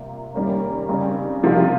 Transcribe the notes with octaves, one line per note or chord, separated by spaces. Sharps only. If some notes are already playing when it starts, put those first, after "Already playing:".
Already playing: C3 G3 A#3 F4
D#3 G3 A#3 C#4
C#3 G3 C4 D#4
C3 F3 C4 F4